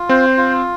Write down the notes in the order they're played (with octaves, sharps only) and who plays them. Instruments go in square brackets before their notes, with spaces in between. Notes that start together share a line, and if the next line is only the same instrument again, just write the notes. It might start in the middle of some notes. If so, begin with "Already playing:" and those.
Already playing: [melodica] F4
[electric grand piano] C4 [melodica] C5
[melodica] F4